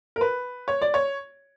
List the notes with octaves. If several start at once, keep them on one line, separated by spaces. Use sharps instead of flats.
A#4
B4
C#5
D5
C#5